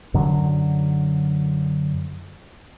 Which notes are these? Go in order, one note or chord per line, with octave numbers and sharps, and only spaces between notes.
F#2 D3 F#3